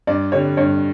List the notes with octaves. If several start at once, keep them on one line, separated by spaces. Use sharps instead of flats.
G2 D5
D3 G3 C#5
G2 C#5